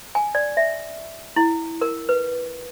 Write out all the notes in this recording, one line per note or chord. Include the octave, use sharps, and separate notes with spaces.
G#5
D5
E5
E4
A#4
B4